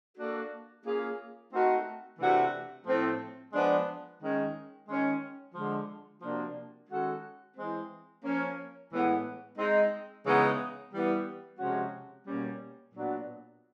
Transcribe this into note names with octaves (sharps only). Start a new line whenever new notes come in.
A#3 D4 F#4 A4
A#3 C#4 F4 G#4
A3 C4 D#4 F#4 A#4
C3 E3 A3 D4 F#4
A2 F3 A3 C4
F3 G#3 B3 D4
D#3 G#3 C#4
D#3 G#3 C#4
D3 F3 G#3
C3 F3 A#3 D4 F#4
D#3 G#3 C#4 F#4 A4
E3 G#3 C4
F3 A#3 C#4
A2 E3 G#3 B3
G#3 C4 D#4
C#3 E3 G#3 B3 D#4
E3 G3 B3
C3 F3 G#3 C#4 F#4
B2 G3 A#3 C#4
A#2 F#3 B3 D4 F#4